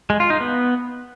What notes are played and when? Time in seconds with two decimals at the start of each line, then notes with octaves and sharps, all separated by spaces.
0.10 G#3
0.20 F4
0.30 D#4
0.40 B3